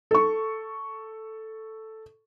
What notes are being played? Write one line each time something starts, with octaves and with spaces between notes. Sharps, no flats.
A4 C#6